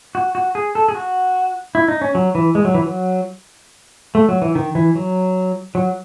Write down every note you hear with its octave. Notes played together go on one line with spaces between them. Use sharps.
F#4
F#4
G#4
A4
G#4
F#4
E4
D#4
C#4
F#3
E3
G#3
F#3
E3
F#3
A3
F#3
E3
D#3
E3
F#3
F#3